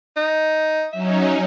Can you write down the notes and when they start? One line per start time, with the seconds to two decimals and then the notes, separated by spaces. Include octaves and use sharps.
0.17 D#4
0.92 F#3 C#4 D#4 E5